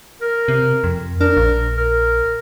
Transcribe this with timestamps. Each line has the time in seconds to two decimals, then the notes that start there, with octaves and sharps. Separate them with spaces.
0.22 A#4
0.48 C3
0.84 F2
1.21 D4 A#4
1.37 A#1
1.78 A#4